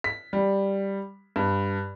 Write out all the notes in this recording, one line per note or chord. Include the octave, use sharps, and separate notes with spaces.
B6
G3
G2